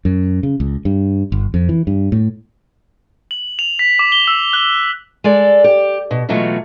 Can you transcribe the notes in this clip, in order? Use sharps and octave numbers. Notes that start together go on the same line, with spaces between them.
F#2
C#3
C#2
G2
G1
F2
E3
G2
A2
F#7
F7
B6
D6
G7
E6
F#6
G#3 A4 D5
G4
B2
B2 E3 F#3 G#3 A3 F4